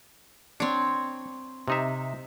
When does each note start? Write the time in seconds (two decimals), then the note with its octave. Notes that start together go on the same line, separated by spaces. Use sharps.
0.60 C4 D4 C#5
1.68 C3 D#4 E5